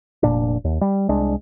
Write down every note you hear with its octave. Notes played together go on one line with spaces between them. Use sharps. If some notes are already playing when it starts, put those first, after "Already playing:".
F1 A#2 D4
D#2
G3
C2 G#3 D4